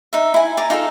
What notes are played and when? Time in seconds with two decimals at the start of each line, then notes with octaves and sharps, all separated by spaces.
0.13 D#4 E5
0.34 E4 G#5
0.57 D5 G#5 A#5
0.70 D#4 F4 G4 A4